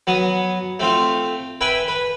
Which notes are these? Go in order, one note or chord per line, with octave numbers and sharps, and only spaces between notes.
F#3 B3 D#6
A3 C4 F4
B4 E5 G5 G#5 B5
B4